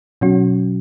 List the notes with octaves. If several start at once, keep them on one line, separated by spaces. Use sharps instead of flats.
B2 F#3 C#4 F#4